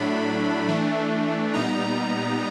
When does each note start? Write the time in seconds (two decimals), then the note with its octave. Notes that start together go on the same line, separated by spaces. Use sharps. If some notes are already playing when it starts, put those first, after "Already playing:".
Already playing: A2 F#3 A3 D4 B5
0.68 E3 A3 D4
1.54 A#2 G3 B3 D#4 A#5